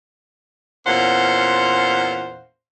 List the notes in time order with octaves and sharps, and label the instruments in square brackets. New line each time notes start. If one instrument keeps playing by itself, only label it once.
[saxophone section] E2 A#2 C#4 C5 F5 F#5